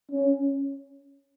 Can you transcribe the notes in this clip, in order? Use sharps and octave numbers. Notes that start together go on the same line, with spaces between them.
C#4